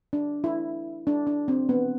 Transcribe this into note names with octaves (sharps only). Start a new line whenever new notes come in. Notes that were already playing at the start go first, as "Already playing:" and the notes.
D4
E4
D4
D4
C4
B3